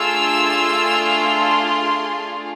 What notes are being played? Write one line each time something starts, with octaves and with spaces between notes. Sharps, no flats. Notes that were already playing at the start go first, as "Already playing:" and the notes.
Already playing: A3 D4 F4 G#4 E6
C6